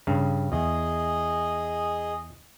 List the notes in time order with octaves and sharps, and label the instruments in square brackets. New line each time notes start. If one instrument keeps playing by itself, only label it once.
[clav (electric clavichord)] G2 C#3
[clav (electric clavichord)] E2 [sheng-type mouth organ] G#4 D#5